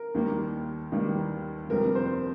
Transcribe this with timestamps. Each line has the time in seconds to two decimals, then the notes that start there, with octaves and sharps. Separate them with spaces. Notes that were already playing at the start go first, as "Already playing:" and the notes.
Already playing: A#4
0.14 D#2 D#3 G3 A#3
0.92 D#2 D#3 G3 A#3
1.69 G1 F2 C3 G3 A#3 A#4
1.95 C5